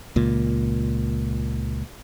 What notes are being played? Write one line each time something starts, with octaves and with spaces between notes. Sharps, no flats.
C#2 A#2